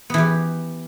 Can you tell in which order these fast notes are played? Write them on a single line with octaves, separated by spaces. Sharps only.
B3 E3 G4